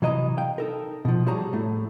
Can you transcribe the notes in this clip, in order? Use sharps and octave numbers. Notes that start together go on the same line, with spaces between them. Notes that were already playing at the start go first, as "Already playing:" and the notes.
C3 E3 F#3 D#5 E5 A#5
F5 G5
D#4 A4 A#4
B2 F3
G3 F#4 G#4 C#5 A5 A#5
A2 A3